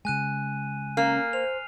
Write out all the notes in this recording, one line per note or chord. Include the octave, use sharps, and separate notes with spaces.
C#3 G#3 G#5 F#6 D#7
A#3 C#4 F6 C7
C5 F7